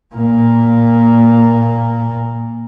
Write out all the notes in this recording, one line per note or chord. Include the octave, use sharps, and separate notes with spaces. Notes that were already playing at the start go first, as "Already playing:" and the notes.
A#2 A#3